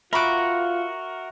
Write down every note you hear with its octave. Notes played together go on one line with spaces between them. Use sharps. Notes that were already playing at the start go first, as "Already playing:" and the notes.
F4 F#4 A#4 E5 B5 C#6 D6 F#6